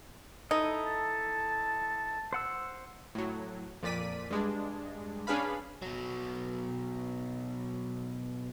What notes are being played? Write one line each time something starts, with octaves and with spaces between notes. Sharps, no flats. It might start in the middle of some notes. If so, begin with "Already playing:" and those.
D#4 E4 A4 D#5
A5
C5 F#5 E6
A2 F#3
F2 A#2 D5 B6 D#7
G2 G#3 D4
C#4 D4 G#4 B4 F5 B5
B2 F#3